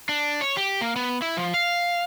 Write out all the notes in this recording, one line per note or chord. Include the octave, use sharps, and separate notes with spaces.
D4
C#5
G4
A#3
B3
E4
F3
F5